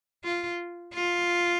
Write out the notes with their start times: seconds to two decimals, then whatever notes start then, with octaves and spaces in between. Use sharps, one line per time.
0.24 F4
0.94 F4